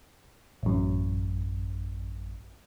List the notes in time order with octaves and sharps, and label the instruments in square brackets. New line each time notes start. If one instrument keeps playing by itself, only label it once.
[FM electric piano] A1 F#2